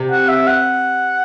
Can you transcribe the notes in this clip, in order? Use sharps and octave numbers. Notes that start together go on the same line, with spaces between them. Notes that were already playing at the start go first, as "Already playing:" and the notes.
Already playing: C3
F#5
E5
F#5